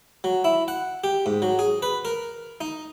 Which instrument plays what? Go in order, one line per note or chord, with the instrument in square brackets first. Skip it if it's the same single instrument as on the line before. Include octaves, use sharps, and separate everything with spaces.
[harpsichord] F#3
E4
F#5
G4
G#2
F#3
G#4
B4
A#4
D#4